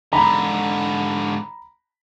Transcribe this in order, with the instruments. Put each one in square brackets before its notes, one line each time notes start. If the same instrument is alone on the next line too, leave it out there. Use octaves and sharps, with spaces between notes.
[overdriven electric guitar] G#2 D3 [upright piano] A#5 B5